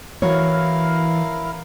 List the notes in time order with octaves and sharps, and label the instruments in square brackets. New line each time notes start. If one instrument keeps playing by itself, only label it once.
[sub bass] E3 [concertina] E4 A#4 F5 [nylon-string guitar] F#4 C#5